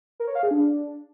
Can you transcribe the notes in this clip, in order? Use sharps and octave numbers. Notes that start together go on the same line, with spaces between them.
A#4
C#5
F5
G#4
D4